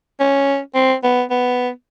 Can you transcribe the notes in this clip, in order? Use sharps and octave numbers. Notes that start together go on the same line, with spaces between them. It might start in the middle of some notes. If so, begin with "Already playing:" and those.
C#4
C4
B3
B3